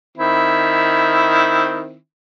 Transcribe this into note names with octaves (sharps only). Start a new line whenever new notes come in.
D#3 C4 E4